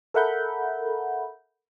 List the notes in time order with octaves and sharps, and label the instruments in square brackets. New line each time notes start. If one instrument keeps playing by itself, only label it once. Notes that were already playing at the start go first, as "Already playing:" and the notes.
[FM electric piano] A4 A#4 E5 F#5 B5 G6